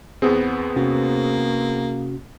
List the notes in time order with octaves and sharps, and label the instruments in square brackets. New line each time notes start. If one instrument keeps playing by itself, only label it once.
[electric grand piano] E2 B3 C4 [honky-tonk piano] G#4
[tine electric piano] C3 C#4 F#4 [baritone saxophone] A#3